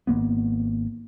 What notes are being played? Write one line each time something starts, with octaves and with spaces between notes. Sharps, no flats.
G#1 G2 A#3 B3